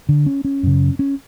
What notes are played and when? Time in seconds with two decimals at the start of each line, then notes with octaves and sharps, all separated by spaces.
0.09 D3
0.26 C#4
0.45 C#4
0.63 F#2 C#3
0.99 C#4